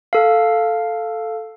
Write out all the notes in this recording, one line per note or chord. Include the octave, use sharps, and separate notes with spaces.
A4 F5